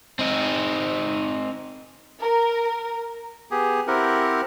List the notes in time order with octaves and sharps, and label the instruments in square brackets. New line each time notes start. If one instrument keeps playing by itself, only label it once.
[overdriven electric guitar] C4 D#4
[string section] A#4
[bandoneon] B3 G4 G#4
C4 E4 G4 A#4 F#5